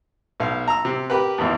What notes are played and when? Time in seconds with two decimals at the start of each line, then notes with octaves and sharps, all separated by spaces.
0.40 B1 F5
0.68 A#5 E6
0.85 C3
1.10 G4 A#4 B4
1.38 G#1 E2